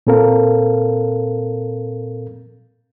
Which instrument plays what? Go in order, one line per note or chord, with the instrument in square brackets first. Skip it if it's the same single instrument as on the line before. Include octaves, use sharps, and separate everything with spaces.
[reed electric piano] A#2 C4 A4 A#4 F5